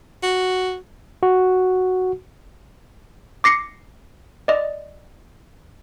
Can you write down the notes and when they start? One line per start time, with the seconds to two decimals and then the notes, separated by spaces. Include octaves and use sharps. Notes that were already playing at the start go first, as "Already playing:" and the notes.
0.23 F#4
1.23 F#4
3.44 D6 A#6 C7 C#7
4.48 D5 D#5